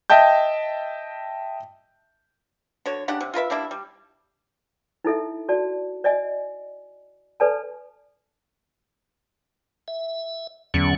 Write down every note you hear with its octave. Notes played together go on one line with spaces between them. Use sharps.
D#5 E5 G5 A5 G6
D3 F#4 C#5
C#3 D4 G4 F#5
C3
F4 A#4 B4 E5
G3 A#3 D4 E4
G3
D#4 E4 A4 E5
F#4 D5 A5
D5 D#5 G#5
A4 B4 D5 G#5 A5
E5
E2 D3 F#3 C#4